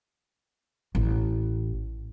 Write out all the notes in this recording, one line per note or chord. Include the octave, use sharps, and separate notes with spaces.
A1